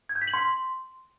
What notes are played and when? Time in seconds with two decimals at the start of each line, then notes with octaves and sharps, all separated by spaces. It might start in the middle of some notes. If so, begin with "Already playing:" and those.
0.09 G#6
0.15 G6
0.21 B6
0.28 F#7
0.34 C6